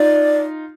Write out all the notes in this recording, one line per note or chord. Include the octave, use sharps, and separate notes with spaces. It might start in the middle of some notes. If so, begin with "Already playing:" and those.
Already playing: D#4 F4 D5